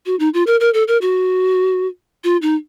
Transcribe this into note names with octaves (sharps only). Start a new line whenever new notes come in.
F#4
D#4
F4
A#4
A#4
A4
A#4
F#4
F4
D#4